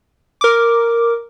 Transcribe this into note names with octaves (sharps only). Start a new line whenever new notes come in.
A#4 D6